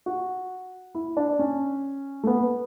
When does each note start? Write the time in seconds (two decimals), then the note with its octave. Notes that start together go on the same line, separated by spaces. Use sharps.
0.06 F#4
0.95 E4
1.17 D4
1.39 C#4
2.23 A3
2.27 B3